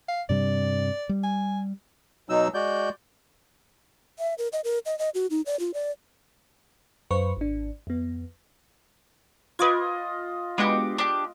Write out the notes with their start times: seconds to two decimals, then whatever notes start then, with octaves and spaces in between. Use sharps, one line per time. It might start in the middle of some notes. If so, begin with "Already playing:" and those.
0.08 F5
0.29 G2 C3 G3 D5
1.09 G3
1.23 G#5
2.30 B2 F#3 D#4 E6
2.54 G#3 F#4 D5 G6
4.19 E5
4.38 A#4
4.53 D#5
4.64 A#4
4.86 D#5
4.99 D#5
5.15 F#4
5.30 D#4
5.46 D5
5.60 F4
5.74 D5
7.11 F#2 B4 C5 C#6
7.37 G#1 D4
7.87 F2 B3
9.59 F4 B4 D#5 D6 G#6
10.58 G#3 B3 D4 F#4 G4
10.98 D4 G4